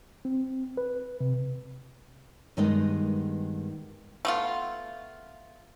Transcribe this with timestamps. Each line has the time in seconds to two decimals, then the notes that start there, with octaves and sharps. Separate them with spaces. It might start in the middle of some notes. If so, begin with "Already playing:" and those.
0.25 C4
0.77 B4
1.20 C3
2.57 G2 D#3 G#3 B3 D#4 D#5
4.25 A3 B3 F4